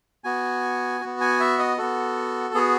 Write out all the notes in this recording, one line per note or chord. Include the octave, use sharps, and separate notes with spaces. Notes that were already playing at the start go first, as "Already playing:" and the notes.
B3 F#4 G#5
B3 F#4
G#5
E5
D#5
B3 F#4 A4
B3 F#4 G#4